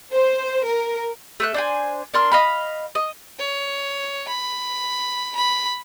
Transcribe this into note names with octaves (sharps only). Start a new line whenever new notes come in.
C5
A#4
A3 E5 F#6
D4 C5 G#5
D4 A#4 C6 F6
D#5 F5 B5
D#5
C#5
B5
B5